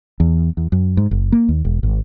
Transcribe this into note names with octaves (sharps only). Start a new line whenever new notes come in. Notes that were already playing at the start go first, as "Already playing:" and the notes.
E2
E2
F#2
G#2
F#1
A#3
D#2
E1
G#1